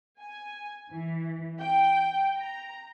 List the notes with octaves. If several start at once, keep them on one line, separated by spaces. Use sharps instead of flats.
G#5
E3
G5
A#5